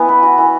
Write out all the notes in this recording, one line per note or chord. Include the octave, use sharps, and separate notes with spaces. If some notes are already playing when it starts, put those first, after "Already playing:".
Already playing: E3 B3
B4
F#4
E3